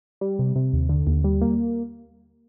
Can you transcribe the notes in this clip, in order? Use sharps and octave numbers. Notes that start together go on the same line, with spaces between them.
G3
C3
C3
D#2
D3
D#2
G3
A#3